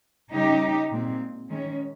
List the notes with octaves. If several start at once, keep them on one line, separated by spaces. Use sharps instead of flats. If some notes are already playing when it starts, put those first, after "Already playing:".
C#3 G3 C#4 D#4 G4
A#2 G#3 C4
D#3 G#3 C#4